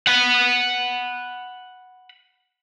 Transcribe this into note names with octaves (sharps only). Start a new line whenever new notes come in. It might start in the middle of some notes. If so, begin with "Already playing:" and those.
F#5 B5